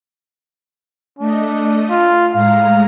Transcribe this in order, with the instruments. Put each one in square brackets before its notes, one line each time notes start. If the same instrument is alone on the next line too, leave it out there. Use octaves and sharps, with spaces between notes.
[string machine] A3 D#5 [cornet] D4
[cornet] F4
[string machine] A2 G#3 A#5 [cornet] F5